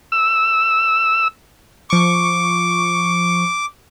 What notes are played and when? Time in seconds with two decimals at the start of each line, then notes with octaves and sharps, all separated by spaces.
0.12 E6
1.90 F3 C#6 D6